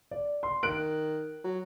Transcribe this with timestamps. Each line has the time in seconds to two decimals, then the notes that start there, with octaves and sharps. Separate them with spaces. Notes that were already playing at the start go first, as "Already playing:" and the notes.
0.11 D5
0.43 C6
0.63 D#3 F#6 D7
1.44 F#3